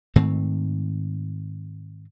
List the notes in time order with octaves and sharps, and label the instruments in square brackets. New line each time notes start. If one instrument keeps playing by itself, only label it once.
[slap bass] G#2 D#3 A3 C4